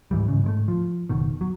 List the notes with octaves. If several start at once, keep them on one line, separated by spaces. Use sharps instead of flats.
G#2 E3 G3
G#2 C#3
G#2 G#3 A3
F3
F#1 B2 D#3
F#3